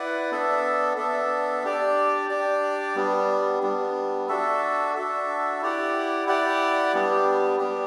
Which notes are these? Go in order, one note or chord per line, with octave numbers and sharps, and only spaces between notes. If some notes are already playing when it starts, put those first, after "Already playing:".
Already playing: E4 B4 D5 F#5
B3 D4 A4 E5
B3 D4 A4 E5
D4 G4 D5
D4 G4 D5
G3 B3 D4
G3 B3 D4
D4 F#4 A4 E5
D4 F#4 A4 E5
E4 G4 D5 F#5
E4 G4 D5 F#5
G3 B3 D4 G4
G3 B3 D4 G4